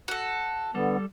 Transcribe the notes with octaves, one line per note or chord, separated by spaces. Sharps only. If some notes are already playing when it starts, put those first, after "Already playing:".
F#4 A4
D3 G3 B3 A4